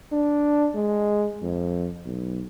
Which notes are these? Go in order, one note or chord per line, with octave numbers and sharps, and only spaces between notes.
D4
G#3
F2
B1